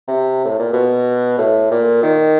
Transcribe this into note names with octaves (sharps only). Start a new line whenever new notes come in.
C3
A2
A#2
B2
A2
A#2
D#3